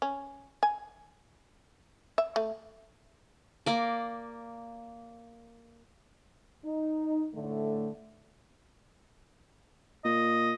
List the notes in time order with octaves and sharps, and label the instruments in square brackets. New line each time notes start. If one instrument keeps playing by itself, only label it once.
[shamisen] C#4
G#5
E5
A3
[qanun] A#3 D5
[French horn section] D#4
A2 D3 A3
[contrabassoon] A#2 [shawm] D#5